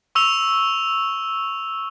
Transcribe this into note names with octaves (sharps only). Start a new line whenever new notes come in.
C#6 E6 F7 G7